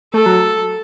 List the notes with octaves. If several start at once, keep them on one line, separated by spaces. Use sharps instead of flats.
A3 A4
F#3